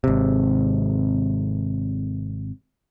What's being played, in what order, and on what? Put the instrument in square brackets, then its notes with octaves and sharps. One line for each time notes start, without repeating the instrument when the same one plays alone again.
[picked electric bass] G#1 C3